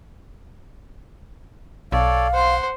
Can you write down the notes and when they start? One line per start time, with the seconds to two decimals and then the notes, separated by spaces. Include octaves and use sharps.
1.92 B1 A4 C#5 D5 F5
2.33 C5 F#5 C6